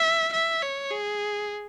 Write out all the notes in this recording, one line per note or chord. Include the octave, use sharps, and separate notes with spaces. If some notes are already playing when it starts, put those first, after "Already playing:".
Already playing: E5
E5
C#5
G#4